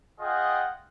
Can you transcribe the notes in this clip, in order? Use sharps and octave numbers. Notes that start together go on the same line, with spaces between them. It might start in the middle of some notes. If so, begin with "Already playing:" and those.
F4 G#4 D#5 F#5 G5